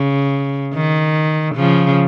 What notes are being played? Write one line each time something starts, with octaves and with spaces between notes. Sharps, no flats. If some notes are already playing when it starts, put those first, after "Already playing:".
Already playing: C#3
D#3
C#3 F3